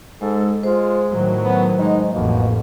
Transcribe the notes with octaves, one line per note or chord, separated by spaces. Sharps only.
G#2 G#3 A4
G#3 F4 C5
A2 D#3 F#3
B3
G#3 D#4
A1 F2 B2 A#3